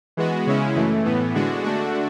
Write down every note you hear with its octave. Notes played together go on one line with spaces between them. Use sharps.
E3 G#3 B3 F#4
C#3 G#3 C#4 E4
F#2 E3 A3
A2 E3 B3
D3 G#3 D4 F#4
D3 A3 D4 F#4